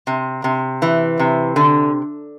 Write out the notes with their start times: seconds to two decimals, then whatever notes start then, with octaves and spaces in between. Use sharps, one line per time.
0.07 C3
0.44 C3
0.82 E3
1.19 C3
1.56 D3